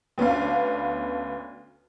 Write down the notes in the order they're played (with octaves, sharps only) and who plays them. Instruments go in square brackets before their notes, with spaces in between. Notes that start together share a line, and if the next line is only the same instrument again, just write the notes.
[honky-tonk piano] D2 B3 C#4 D4 F5